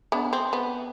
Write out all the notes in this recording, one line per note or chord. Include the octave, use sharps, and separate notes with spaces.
B3 D4
C4
B3